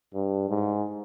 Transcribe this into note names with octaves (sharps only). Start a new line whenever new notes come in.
G2
G#2